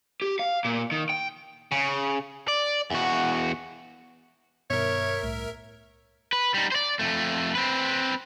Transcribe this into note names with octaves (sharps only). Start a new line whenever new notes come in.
G4
F5
A#2
D#3
G5
C#3
D5
E2 F#4
G2 B2 D#3 A#4 C#5 E5
C2 A2
B4
G3 D#4
C5 D5
F2 A3
C4 B4